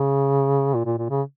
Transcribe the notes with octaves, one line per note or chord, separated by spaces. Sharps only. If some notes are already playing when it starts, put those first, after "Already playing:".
Already playing: C#3
A#2
A#2
A#2
C#3